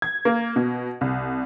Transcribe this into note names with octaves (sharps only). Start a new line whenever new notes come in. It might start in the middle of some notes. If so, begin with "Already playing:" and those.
G#6
A#3
B2
C2